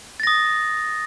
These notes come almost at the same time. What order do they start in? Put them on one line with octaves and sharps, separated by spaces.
A6 A#6 D#6